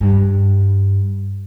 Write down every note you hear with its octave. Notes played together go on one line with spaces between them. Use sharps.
G2